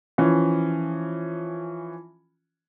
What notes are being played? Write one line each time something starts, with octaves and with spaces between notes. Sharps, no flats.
E3 F3 C#4